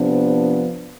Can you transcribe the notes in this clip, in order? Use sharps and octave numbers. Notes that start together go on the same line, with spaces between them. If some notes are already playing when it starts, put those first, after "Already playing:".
Already playing: C3 F3 B3 D4